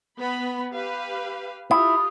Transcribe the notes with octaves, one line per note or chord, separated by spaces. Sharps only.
B3 B5
G4 B4 F5
E4 F4 G4 D#6